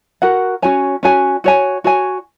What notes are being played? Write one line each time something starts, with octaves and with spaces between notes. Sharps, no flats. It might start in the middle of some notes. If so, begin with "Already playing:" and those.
F#4 A#4 F#5
C#4 F#4 C#5 G#5
C#4 F#4 C#5 G#5
F#4 C#5 G#5
F#4 C#5 G#5